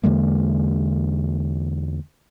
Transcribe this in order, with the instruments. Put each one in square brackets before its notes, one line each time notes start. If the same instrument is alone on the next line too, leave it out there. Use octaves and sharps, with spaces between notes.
[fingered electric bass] E2 D3 G#3 A#3